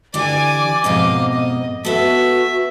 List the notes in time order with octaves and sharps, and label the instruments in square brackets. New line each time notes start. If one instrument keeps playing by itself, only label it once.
[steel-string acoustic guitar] D3 E3 G4 [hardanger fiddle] D5 G#5 [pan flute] D6
[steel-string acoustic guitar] F2 G#2 B2 [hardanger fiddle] D#5 F5
[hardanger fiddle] D#5
[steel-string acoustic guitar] B3 A4 [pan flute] F#4 [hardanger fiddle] E5